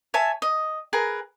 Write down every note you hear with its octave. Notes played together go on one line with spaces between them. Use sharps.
C#5 E5 G#5 A5
D#5
G#4 A#4 B4